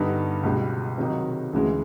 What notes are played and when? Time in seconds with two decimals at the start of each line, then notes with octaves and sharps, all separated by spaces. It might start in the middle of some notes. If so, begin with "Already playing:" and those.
Already playing: G2 D3 G3 B3 D#4
0.43 C#2 B2 G3
0.98 C3 D#3 F#3 A#3 D#4
1.53 D2 C#3 E3 G#3